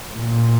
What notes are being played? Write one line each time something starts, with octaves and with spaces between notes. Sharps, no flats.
A#2